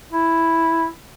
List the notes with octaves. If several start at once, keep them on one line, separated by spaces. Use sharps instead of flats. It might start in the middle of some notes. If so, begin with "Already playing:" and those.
E4